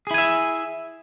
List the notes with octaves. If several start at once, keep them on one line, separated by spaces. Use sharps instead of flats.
E4 G#4 E5 G#5